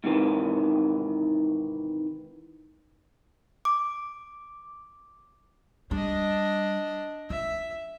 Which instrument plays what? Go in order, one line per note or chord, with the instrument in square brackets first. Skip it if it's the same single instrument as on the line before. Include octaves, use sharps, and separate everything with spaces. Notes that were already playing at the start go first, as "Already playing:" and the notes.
[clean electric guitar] G#2 C3 D#3 E3
[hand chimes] D6
[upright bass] G3 [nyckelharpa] D4 D#5
[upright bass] F4 [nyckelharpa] E5